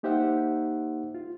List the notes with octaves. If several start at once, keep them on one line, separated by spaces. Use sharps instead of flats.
A#3 D#4 G4 C5 E5 F#5
F4